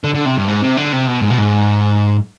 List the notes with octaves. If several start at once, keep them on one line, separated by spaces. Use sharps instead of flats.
D3
D3
C3
G2
G#2
C3
D3
C3
B2
G#2
B2
G#2